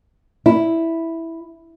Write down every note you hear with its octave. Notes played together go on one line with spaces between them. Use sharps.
E4